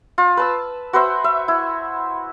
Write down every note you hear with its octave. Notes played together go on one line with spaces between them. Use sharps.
F4
B4 A5 E6
F#4 B4 C5 E5
E5
E4